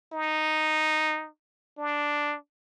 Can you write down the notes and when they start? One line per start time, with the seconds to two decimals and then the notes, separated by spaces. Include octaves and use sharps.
0.13 D#4
1.78 D4